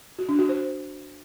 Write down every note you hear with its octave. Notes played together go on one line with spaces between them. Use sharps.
F#4
D4
F#4
C5